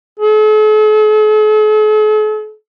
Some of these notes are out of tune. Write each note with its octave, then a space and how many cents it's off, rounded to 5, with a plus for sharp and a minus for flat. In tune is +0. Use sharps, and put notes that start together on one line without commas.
A4 -45